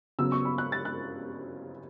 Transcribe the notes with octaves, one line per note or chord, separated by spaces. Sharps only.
C#3 F#3 B3 E6
C#6
B5
F#6
A6
F#6